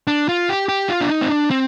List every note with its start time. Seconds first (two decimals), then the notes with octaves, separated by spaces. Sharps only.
0.07 D4
0.29 F4
0.49 G4
0.69 G4
0.90 F4
1.01 D4
1.09 D#4
1.22 C4
1.29 D4
1.51 C4